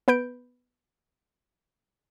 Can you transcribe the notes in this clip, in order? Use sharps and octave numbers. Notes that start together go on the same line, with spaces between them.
B3 B4 G6 D7